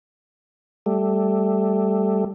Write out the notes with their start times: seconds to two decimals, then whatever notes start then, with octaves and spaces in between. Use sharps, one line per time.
0.86 G3 A3